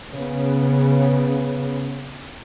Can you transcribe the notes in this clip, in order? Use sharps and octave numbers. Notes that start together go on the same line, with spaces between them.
C#3 B3